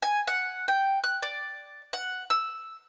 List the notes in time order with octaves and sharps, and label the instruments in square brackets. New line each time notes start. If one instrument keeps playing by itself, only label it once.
[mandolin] G#5
F#5
G5
F#6
D5
F#5
E6